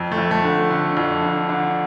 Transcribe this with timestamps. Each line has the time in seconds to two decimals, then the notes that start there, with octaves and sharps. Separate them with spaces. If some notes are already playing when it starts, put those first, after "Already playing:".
Already playing: F2
0.12 A3
0.18 F2
0.31 A3
0.44 D3
0.70 D3
0.97 F2
1.22 D3
1.49 D3